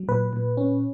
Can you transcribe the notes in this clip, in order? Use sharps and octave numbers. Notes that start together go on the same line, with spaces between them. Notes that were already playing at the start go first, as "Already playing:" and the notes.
Already playing: F#3
A#2 B4
A#2
C#4